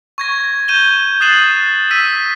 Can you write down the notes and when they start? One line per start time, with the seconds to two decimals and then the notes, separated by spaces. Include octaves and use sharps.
0.18 C#6 G#6 A#6
0.68 G6 D#7 E7 G7
1.20 D#6 F#6 A6 C7 E7 F#7
1.91 E6 B6 D#7